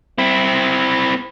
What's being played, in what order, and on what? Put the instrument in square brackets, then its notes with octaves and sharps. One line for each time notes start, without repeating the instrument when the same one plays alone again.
[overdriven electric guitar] C4 E4